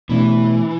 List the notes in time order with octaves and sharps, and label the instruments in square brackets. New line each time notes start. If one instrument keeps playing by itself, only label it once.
[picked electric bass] B2 A3 D4 [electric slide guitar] E3